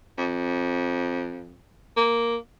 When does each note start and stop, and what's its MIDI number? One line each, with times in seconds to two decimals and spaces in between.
0.18 1.63 41
1.97 2.37 58